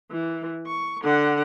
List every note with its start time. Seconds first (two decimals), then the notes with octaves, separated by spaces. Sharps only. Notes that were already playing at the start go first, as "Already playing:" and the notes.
0.11 E3
0.67 C#6
1.04 D3 F#5